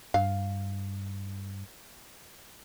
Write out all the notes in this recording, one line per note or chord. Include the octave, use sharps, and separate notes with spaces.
G2 F5